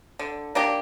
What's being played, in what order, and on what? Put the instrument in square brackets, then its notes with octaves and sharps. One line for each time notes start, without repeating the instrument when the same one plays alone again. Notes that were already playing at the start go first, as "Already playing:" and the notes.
[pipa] D3
A#3 D4 G4